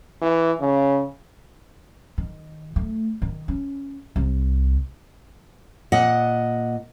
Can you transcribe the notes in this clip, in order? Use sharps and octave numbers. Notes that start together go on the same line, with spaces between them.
E3
C#3
D#3
A3
D#3
C#4
C2
A#2 D#5 F#5